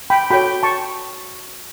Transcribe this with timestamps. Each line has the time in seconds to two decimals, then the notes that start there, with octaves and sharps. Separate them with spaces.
0.10 G5 B5
0.31 F#4 A4 C#5 G5 B5
0.63 A5 C#6